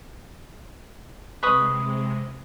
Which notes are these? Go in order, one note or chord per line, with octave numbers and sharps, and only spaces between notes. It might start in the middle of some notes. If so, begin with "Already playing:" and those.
C3 G#3 B4 C#6 D#6